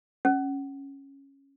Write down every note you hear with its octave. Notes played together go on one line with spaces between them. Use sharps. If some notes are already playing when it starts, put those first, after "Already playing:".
C#4